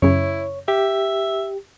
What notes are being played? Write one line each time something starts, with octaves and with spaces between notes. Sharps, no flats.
F#2 C#3 E4 C#5
G4 E5